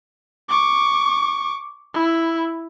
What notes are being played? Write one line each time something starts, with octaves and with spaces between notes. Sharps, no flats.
C#6 D6
E4